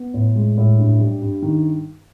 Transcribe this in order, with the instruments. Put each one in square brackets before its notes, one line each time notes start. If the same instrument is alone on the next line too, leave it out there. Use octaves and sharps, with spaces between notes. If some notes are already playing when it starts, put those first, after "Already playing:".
Already playing: [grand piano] B3
A2
G#3
A2
G2
G3
G2
D#3